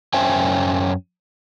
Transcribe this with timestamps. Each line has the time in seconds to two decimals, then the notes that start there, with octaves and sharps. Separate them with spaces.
0.13 F#2 C#4 C5 E5 G5 G#5